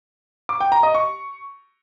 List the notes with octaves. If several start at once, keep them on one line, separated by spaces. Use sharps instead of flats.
D6
G5
A#5
D#5
C#6